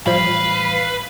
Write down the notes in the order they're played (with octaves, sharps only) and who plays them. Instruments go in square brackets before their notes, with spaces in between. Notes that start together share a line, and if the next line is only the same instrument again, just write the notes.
[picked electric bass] A2 E3 G3 [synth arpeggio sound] F3 F4 C5 [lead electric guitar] B4 [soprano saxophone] F5